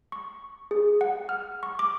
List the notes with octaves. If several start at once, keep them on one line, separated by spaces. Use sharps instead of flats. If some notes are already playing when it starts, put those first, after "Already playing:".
C#6
G#4
F#5
F6
C#6
D6